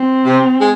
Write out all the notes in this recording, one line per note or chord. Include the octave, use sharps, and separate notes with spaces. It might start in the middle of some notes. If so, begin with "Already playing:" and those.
Already playing: C4
C3
G#3